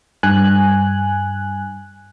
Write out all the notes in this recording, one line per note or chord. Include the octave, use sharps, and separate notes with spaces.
G2 G#5 F#6